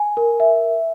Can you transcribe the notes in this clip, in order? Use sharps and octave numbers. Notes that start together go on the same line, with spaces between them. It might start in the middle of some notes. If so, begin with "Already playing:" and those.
Already playing: G#5
A#4
E5